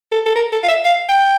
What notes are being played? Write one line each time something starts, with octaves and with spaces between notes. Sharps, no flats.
A4
A4
A#4
A4
F5
E5
F5
G5